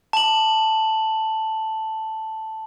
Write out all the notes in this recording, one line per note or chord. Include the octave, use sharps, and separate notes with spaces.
A5 F#7